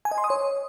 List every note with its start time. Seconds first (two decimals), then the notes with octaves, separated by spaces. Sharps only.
0.05 G#5
0.11 D#5
0.18 C6
0.24 D#6
0.30 C#5